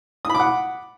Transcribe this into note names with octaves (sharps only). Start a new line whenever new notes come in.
F#5 B5 D6 D#6